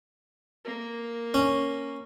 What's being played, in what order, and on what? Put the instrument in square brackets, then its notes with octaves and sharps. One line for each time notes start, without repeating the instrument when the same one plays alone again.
[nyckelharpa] A#3 A#4
[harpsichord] C#4